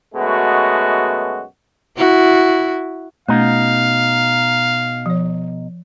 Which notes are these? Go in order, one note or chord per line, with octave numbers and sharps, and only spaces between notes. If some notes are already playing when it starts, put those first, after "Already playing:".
F#2 B2 G#3 A3 F#4
E4 F#4
B2 A3 C#4 D#4 F5
F3 C#5